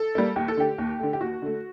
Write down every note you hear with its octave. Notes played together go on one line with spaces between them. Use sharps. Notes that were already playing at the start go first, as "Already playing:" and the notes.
Already playing: A4
G3 A#3
D#2 G4
A4
D3 A3 G4
D#2
D3 A3
G4
D#2 F#4
D3 A3